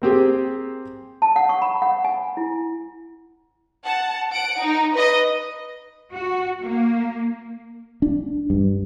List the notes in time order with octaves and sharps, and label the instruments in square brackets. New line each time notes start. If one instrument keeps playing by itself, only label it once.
[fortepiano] A#3 C4 G4 G#4
[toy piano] A5
F#5
C#6
B5
F#5
G#5
E4
[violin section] F#5 A5
F#5 D7
D#4
B4 D#5
[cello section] F#4
A#3
[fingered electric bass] D4
G2